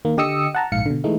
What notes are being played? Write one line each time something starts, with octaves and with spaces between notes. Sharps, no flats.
D#3 A#3
D3 G4 D#5 D#6 E6 C#7
F#5 A5 A#5
A#1 G#2 F5 C#7
B2 D3
E3 G#3 A3 D#4